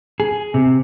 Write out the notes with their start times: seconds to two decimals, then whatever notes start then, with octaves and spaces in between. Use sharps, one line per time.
0.20 G#4
0.54 C3